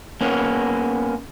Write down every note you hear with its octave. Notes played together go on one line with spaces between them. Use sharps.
A#3 B3 C#4